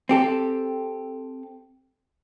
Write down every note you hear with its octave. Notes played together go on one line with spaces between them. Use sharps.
C4 G4 A4